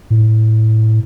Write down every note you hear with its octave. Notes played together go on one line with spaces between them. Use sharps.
A2